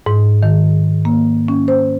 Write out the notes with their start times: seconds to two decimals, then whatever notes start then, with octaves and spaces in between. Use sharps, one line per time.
0.06 G#2
0.43 D#3
1.05 A#3
1.48 C#4
1.68 C5